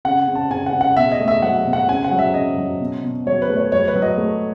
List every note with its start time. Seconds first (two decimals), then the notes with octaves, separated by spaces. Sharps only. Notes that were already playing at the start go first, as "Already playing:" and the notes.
0.05 C#3 F#5
0.28 C#3
0.35 A5
0.51 C#3 G#5
0.66 F#5
0.73 C#3
0.81 F#5
0.97 B2 E5
1.12 D#5
1.20 A3
1.28 E5
1.42 F#3 F#5
1.66 B2
1.73 F#5
1.88 C#3 G#5
2.04 F#5
2.12 F#3
2.19 E5
2.34 C#3 D#5
2.58 F#3
2.80 B2
3.03 B2
3.26 F#3 C#5
3.42 B4
3.50 A3
3.57 C#5
3.72 F#3 C#5
3.88 B4
3.95 F#3
4.02 D#5
4.18 A3